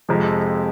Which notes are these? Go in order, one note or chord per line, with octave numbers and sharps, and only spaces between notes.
F2 C3 F3 G#3